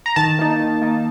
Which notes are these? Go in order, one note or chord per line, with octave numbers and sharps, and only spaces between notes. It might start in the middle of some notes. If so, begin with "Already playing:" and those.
A#5
D#3 A5
A#3 D#4
D#3
A#3 D#4